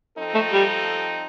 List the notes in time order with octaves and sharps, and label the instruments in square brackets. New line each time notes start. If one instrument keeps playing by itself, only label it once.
[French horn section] F3 C4 D#4 A4
[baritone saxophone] A3
G3